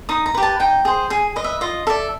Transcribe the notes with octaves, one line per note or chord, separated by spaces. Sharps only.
D#4 D#6
A#5
G4 B4
A5
D#4 G5
G#4 C5
G#4 G#5
B4 D#5
E5
F4 D#5
A4 D5 E5